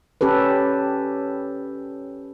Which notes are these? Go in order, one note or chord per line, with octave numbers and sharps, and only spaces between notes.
C#4 G4 A4 B4